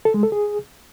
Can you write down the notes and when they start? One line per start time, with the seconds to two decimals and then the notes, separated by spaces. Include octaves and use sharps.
0.05 A4
0.14 G#3
0.23 A4
0.32 G#4